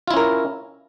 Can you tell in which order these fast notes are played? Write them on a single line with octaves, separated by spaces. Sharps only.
F4 E4 C#4 A#4